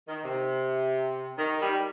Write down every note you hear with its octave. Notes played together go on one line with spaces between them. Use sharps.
D#3
C3
D#3
G3